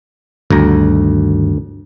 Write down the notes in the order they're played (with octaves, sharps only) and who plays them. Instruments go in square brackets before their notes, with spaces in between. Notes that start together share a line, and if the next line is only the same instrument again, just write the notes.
[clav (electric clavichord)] D2 A#5 [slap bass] G2 D#3 G3